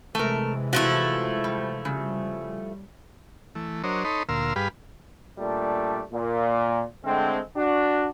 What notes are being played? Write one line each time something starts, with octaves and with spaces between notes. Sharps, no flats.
C3 E3 G#3 A3 A#4
F3 A3 E4 F#4
G3
C#3 G3
E3 A3
F#3 D4 A#4 C5 C#5 D#5
D#4 A4 C#5 D#5 B5 C6
D2 A#2 A#4 F5 C6 E6
G2 G4 G#4 B4 F5 B5
A#2 G3 A3 D4 D5
A#2
D3 G#3 A3 C4
D4 F#4